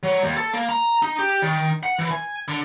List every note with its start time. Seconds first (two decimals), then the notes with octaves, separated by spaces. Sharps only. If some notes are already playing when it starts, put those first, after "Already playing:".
0.03 F#3
0.24 D#2
0.36 A4
0.53 A#3
0.69 A#5
1.03 D#4
1.19 G4
1.42 D#3
1.83 F#5
1.99 E3
2.11 G#5
2.48 D3